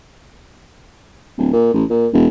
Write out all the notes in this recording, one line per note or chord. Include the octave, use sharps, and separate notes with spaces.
D1
A#2
A1
A#2
E1